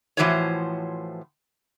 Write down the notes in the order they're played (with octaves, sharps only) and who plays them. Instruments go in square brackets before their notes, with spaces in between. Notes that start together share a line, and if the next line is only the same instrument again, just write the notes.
[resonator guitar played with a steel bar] A2 E3 F3 F#4 C5 C#5